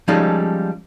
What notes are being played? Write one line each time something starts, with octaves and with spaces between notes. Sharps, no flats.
F3 G3 G#3 C#4 D#4 A4